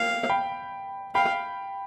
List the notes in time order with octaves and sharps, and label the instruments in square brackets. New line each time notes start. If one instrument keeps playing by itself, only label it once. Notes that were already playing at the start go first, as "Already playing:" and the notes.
Already playing: [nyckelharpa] F5 [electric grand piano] G5
[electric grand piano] G5 B5
[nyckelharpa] F5 [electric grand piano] G5 B5